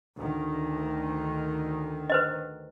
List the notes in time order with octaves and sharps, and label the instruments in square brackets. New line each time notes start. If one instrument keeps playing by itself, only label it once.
[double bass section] D2 D#3
[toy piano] B4 C5 D#5